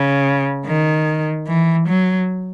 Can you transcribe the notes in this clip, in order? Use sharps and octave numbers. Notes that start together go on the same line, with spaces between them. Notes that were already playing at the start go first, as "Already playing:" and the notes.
Already playing: C#3
D#3
E3
F#3